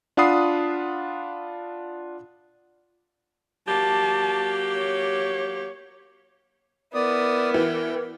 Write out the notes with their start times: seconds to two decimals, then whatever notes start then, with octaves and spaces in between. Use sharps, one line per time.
0.17 D4 F4 F#5 B5 D#6 C7
3.68 F#3 A#3 G4 A5
4.76 C#5
6.94 B3 E4 A#4 D5 D#6
7.54 E3 G5